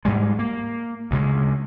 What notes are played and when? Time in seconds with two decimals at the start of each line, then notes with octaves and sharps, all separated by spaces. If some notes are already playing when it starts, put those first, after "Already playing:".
0.05 G#2 G3 G#3
0.39 A#3
1.11 D2 C#3 G#3